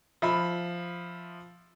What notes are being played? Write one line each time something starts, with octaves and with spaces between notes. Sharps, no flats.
F3 E5 B5